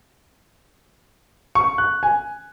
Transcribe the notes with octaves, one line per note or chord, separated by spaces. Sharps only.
C#6
F#6
G#5